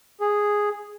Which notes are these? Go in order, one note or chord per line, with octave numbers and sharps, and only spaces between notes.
G#4